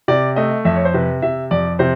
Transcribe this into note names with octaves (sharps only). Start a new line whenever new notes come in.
C3 D5
A3 D#5
F2 E5
C#5
C5
C3 B4
C3 E5
F2 D5
C3 C5